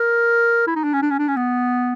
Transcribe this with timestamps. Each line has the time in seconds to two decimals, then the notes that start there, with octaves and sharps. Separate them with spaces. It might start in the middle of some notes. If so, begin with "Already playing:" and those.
Already playing: A#4
0.67 E4
0.76 D#4
0.84 D4
0.93 C#4
1.02 D4
1.11 C#4
1.19 D4
1.28 C#4
1.37 B3